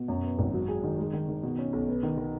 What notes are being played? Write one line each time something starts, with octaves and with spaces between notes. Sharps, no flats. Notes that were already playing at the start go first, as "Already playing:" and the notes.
Already playing: B2
F#2
B3
G#1
F#3
G#4
D#3
G#3
D#3
D#3
B2
C#4
B1
B3
D#3
D#3